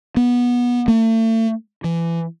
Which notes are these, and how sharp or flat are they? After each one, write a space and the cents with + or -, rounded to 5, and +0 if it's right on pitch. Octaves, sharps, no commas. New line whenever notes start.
B3 -20
A3 +40
E3 +25